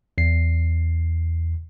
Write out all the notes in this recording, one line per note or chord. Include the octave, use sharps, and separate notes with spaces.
E2 C7